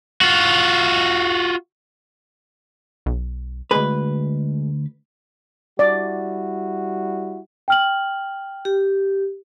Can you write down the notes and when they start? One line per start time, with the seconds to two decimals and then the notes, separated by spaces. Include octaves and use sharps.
0.21 F4 F#4
3.06 B1
3.71 D2 G#3 B4
5.79 G3 E4 F#4 D5
7.68 G5 F6 F#7
8.65 G4